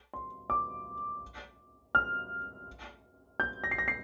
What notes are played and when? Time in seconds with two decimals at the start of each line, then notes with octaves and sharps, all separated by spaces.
0.14 C6
0.50 D6
1.95 F6
3.40 G6
3.64 A#6
3.71 C7
3.78 A#6
3.88 C7